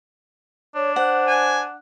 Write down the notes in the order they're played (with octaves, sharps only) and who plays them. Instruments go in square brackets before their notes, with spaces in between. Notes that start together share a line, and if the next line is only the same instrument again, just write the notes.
[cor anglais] D4 [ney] C#5
[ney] C5 [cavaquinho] F#5
[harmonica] G#5